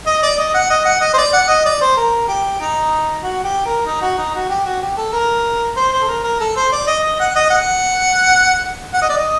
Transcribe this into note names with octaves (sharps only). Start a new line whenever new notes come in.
D#5
D5
D#5
F#5
D#5
F#5
D#5
C5
D5
F#5
D#5
D5
C5
A#4
G4
D#4
F#4
G4
A#4
D#4
F#4
D#4
F#4
G4
F#4
G4
A4
A#4
C5
C5
A4
A#4
A#4
A4
C5
D5
D#5
D#5
F#5
D#5
F#5
F#5
D#5
D5
D#5